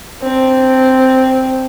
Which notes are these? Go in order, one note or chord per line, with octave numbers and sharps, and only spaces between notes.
C4 D4